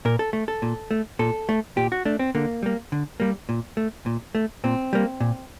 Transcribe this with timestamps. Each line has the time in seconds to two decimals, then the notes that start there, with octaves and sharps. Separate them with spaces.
0.05 A#2 A#4
0.19 A4
0.33 A3
0.48 A4
0.62 A#2
0.91 A3
1.19 A#2 A4
1.49 A3
1.77 A#2 G4
1.92 F#4
2.05 A3 D4
2.19 C4
2.35 D3 A#3
2.63 G3 A#3
2.92 D3
3.20 G3 A#3
3.49 A#2
3.77 A3
4.06 A#2
4.35 A3
4.64 A#2 C4
4.93 G3 A#3
5.20 A#2